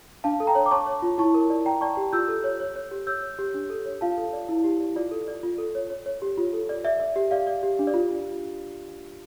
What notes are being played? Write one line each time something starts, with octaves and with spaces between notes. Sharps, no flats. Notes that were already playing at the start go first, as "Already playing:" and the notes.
D4 F5 A5
A4
G5 A#5
C#5
D6
C#5 A5 C#6
C#5
F4
E4 A5 C#6
A#4
D5
D5 G5 A#5
D5 A5 C#6
G4
F4 E6 G6
A4
C#5
C#5
C#5
G4
C#5 E6 G6
C#5
G4
D4
A4
C#5
F4 F5 A5
A4
D5
E4
G4
D5
F4 D5
A4
D5
F4
A4
C#5
C#5
C#5
G4
F4
A4
D5
D5 E5
D5
G4
D5 F5
D5
G4
D4
D5
F4